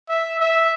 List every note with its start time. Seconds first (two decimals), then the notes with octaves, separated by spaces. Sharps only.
0.09 E5
0.40 E5